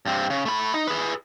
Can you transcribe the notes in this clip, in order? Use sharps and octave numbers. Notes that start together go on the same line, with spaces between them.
G2 C4
C#3
A3 B5
D#4
G#4 B4